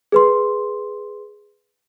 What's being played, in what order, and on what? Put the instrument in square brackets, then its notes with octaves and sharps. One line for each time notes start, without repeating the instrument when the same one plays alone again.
[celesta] G#4 B4 C6